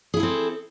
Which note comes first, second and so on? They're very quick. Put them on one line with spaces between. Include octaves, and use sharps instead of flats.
G#4 E4 A4 C4